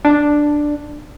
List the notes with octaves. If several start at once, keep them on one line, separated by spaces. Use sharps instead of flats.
D4